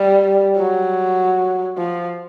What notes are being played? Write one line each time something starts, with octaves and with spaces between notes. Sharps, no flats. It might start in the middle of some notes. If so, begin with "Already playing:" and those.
Already playing: G3
F#3
F3